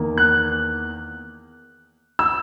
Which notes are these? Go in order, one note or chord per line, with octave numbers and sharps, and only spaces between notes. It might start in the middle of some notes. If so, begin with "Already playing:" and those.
Already playing: E2 D#3 A#3
F#6
E6